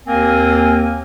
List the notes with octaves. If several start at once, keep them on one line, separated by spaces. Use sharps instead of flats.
D#2 A#3 C4 A#4 G#5